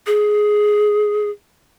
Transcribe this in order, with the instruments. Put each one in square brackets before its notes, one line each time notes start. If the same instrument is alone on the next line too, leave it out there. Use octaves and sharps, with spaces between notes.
[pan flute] G#4